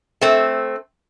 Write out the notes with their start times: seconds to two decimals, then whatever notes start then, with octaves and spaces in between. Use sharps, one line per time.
0.21 A3 C4